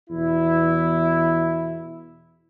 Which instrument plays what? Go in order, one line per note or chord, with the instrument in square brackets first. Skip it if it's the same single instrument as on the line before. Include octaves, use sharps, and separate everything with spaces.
[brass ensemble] E2 B2 E4